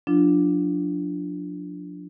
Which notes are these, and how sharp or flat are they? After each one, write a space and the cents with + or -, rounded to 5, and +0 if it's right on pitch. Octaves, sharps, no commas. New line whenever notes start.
F3 +35 D4 +0 F4 -25